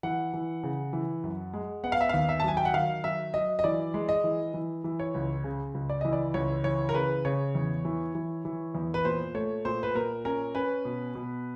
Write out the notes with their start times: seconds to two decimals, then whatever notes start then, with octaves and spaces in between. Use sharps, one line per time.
0.03 E3 F#5
0.34 E3
0.63 C#3
0.93 E3
1.24 F#2
1.53 G#3
1.84 B3 F#5
1.92 F5
2.01 E5
2.09 D#2 F5
2.29 E5
2.40 A5
2.44 F#3 G#5
2.57 G5
2.65 F#5
2.74 D#3 F5
3.04 F#3 E5
3.34 F#3 D#5
3.59 D#5
3.64 E3 D5
3.94 G#3
4.09 D#5
4.24 E3
4.54 E3
4.84 E3
5.00 C#5
5.14 C#2
5.44 C#3
5.74 C#2
5.90 D5
6.01 E3 D#5
6.13 D5
6.34 C#2 C#5
6.64 E3 C#5
6.89 A#4
6.94 C#3 B4
7.25 C#3 C#5
7.55 E2
7.85 E3
8.15 E3
8.45 E3
8.75 E2
8.94 B4
9.05 A#2 C5
9.35 A3 C#5
9.65 A#2 C5
9.83 B4
9.95 A#2 A#4
10.25 C#4 A#4
10.55 C#4 B4
10.85 B2
11.15 B2